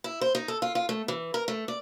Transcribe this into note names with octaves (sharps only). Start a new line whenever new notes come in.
E4
C5
D#4
A4
F4
F4
A3
E3
A#4
A3
D5